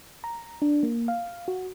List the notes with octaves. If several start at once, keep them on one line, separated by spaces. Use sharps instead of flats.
A#5
D4
A#3
F5
F#4